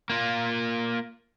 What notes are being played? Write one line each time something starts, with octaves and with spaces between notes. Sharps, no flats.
A#3 F4